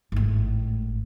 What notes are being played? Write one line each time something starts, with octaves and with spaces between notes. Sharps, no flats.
G#1 A2